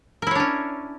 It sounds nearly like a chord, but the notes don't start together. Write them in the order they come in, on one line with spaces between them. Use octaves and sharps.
A#4 E4 C#5 D4 C#4